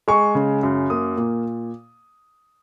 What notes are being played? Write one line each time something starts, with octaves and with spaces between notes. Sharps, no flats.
G#3 C#6
C#3
F#2
A#3 D#6
A#2